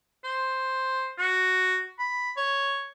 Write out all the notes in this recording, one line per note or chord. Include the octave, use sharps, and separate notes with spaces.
C5
F#4
B5
C#5